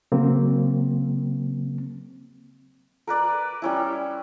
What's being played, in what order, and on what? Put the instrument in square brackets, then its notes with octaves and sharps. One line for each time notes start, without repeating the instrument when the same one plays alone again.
[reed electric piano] C#3 F#3 A#3 C4
[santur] A#4 B4 D5
G3 C#4 E4